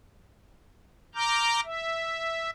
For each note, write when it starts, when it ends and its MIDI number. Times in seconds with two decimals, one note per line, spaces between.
1.15 1.60 82
1.15 1.60 86
1.15 1.60 89
1.15 1.60 91
1.64 2.50 76